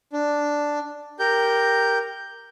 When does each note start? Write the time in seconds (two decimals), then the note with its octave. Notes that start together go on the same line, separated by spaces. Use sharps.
0.13 D4
1.19 G4 A#4 G6